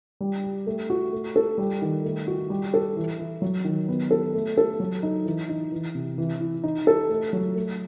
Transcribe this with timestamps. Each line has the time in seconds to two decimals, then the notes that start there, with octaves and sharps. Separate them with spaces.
0.21 G3
0.44 G4
0.67 A3
0.90 F#4
1.12 A3
1.36 A4
1.58 G3
1.82 D#3
2.04 A3
2.27 F#4
2.50 G3
2.74 A4
2.96 E3
3.19 E4
3.42 F#3
3.65 D#3
3.88 B3
4.11 A4
4.34 A3
4.58 A4
4.80 F#3
5.03 D#4
5.26 E3
5.49 D#4
5.72 E3
5.95 C3
6.18 E3
6.40 E4
6.64 D#4
6.87 A4
7.09 A3
7.33 F#3
7.56 A3